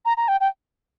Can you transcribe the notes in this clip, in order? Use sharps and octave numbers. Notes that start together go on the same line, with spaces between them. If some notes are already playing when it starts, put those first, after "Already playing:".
A#5
A#5
G5
G5